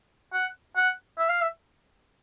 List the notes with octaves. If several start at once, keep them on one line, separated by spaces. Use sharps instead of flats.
F#5
F#5
E5
F5
E5